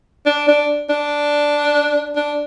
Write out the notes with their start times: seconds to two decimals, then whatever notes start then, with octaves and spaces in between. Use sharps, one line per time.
0.26 D4
0.48 D4
0.90 D4
2.16 D4